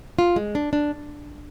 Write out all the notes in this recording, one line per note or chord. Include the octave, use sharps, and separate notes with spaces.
F4
G#3
D4
D4